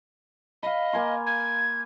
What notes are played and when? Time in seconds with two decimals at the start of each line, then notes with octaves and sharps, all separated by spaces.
0.63 D#5 F5 B5
0.93 A#3 G#5 C6
1.26 G#6